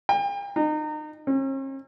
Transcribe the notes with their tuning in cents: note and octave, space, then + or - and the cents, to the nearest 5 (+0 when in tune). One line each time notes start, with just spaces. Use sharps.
G5 +40
D#4 -30
C#4 -45